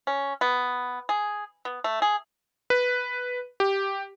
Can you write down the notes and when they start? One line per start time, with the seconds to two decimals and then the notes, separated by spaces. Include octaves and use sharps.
0.07 C#4
0.41 B3
1.09 G#4
1.65 B3
1.84 A3
2.02 G#4
2.70 B4
3.60 G4